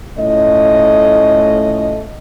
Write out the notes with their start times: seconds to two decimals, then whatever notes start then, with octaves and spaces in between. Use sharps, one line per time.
0.17 A2 A3 C#4 F4 D#5